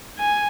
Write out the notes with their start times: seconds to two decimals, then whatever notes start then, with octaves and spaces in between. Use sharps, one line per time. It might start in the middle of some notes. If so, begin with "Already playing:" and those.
0.19 G#5